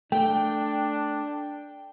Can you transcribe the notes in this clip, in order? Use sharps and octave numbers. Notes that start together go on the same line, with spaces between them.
A3 D4 G5